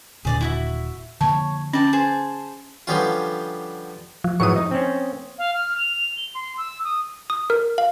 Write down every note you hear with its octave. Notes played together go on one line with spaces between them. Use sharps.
D#1 A#2 D3 G#4 D5 D#5
E4 F#4 E5
D3 F3 A#3 C#5 A5
C#4 D5 G5 A5
G#4 C5 A5
D3 F3 G3 B3 C#4 F4
F3
G#2 E3 F#3 C#6 D#6
D#4
C4 C#4
F5
F6
F7
G7
C6
E6
D#6
D#6
A#4
F5